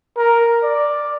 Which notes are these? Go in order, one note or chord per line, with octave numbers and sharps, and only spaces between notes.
A#4
D5